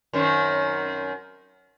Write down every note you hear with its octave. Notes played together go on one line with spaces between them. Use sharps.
F#2 D#3 C4